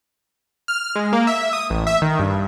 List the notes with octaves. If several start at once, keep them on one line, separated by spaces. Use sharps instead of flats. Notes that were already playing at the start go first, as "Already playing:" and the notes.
F6
G#3
A#3
E5
D#6
A1
E5
D#3
G2